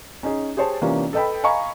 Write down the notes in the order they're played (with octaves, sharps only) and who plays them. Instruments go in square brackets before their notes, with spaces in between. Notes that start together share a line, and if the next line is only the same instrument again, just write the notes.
[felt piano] C#4 D#4 G#4
G4 G#4 C5 C#5 A5
C3 E3 A#3 C#4 D4 F4
A4 B4 D#5 G5 B5
D#5 F5 G#5 A#5 B5 C#6